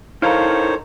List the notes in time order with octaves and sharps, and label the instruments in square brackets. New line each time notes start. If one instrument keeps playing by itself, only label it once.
[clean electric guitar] D#4 A4 A#4 [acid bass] E4 [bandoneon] C5 C#5 [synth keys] F5